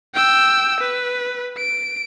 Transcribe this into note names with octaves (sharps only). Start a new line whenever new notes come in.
G5 E6
B4
D7